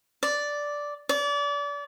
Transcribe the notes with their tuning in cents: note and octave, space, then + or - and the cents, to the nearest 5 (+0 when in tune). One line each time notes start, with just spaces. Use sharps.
D5 -5
D5 -35